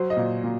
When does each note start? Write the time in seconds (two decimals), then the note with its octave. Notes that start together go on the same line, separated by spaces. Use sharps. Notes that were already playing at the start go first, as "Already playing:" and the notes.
Already playing: F#3 C5
0.10 D#5
0.17 A#2
0.44 A#2